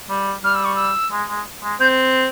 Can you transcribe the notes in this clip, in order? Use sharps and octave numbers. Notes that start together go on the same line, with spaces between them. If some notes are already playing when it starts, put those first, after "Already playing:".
G3
G3 F6
E6
C#6
E6
G#3
G#3
G#3
C4 G6